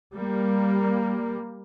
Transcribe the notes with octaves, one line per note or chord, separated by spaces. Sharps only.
G3 A#3